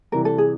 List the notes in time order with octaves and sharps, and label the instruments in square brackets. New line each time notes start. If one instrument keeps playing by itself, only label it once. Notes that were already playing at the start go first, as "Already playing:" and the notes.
[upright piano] C3 E3 G3 [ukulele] A#4
[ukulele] A4
G#4